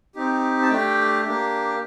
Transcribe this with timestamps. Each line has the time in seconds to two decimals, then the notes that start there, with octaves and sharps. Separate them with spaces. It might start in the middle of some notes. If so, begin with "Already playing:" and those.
0.15 C4 D#4 G4
0.62 A5
0.69 A3 D4 G4 G5
1.25 A#3 D4 G4